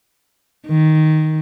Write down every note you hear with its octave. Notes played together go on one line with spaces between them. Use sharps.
D#3